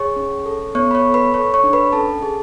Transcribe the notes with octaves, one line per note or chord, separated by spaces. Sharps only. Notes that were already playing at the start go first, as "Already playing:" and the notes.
Already playing: G#4 C#5 C#6
C#4
A4
B3 C#5 C#6
B5
C#5 C#6
A4
B4 B5
A4 C#5 C#6
C#5 C#6
D4
B4 B5
C#4 A4 A5
G#4